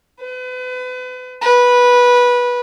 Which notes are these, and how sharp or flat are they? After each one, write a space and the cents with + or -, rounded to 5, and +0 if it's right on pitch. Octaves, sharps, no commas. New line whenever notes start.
B4 +35
B4 -15